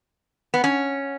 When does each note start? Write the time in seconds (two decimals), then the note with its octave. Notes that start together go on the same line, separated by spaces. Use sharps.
0.54 B3
0.64 C#4